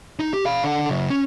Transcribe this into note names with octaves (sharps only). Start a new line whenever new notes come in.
D#4
G4
F5 B5
D3 F#5
C#3 F#3
C#4